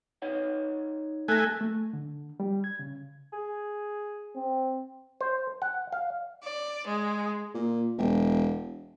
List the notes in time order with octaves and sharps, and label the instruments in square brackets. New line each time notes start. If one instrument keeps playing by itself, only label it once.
[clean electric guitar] D#4 C#5 F#5
[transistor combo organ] A3 G#5 [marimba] F#6 A#6
[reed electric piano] A3
D3
G3
G#6
C#3
[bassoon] G#4
[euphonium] C4
[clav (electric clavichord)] C5
F#5
F5
[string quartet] D5
G#3
[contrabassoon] A#2
E1